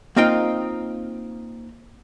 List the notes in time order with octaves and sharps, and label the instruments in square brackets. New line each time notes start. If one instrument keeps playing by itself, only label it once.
[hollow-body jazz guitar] A#3 C4 D#4 F4 G5